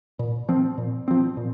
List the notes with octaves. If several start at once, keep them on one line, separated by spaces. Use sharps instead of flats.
A#2
F3 C4
A#2
F3 C4
A#2